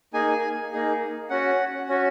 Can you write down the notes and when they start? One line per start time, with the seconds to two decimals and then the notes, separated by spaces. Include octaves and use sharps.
0.13 A#3 D#4 G#4 G#5
0.72 A#3 D#4 G#4
1.30 C#4 F#4 F#5
1.89 C#4 F#4